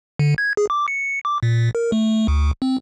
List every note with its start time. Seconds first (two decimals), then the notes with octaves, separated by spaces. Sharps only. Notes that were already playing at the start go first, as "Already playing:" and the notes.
0.19 D3
0.38 G#6
0.57 G#4
0.70 D6
0.88 C#7
1.25 D6
1.43 A#2
1.75 A#4
1.92 A3
2.28 D2
2.62 C4